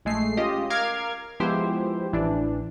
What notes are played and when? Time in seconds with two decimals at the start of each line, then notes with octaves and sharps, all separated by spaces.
0.05 A#1 G#3 A3 C7
0.37 C#4 F4 G4 D#5
0.70 A#4 F5 D6 F6 G#6
1.40 F3 G#3 B3 E4 G4 C5
2.12 A1 E3 D4